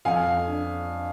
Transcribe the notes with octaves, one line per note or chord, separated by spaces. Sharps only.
F2 F5 G#5
D4